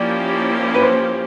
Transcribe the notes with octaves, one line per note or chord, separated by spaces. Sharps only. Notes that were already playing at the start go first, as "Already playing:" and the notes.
Already playing: F3 A#3 C#4 E4 G4 D5
B4
C5